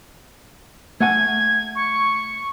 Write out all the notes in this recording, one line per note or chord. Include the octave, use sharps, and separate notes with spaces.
A3 F#5 G#5 G#6
C#6